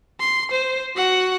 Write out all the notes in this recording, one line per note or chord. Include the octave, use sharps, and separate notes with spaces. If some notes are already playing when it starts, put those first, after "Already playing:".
C6
C5
F#4 F#5